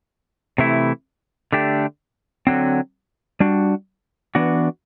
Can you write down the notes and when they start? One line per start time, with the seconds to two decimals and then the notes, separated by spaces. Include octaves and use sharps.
0.58 C3 E3 A3 E4
1.52 D3 A3 D4 G4
2.47 D3 F#3 C4
3.40 G3 D4 F#4
4.35 E3 B3 D4 F#4